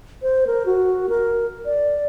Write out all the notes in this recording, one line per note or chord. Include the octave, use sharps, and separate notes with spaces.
C5
A#4
F#4
A#4
D5